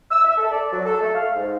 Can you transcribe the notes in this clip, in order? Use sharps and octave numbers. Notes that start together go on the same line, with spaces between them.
E6
E5
A4
D5
F#3
A4
A3
F5
G#2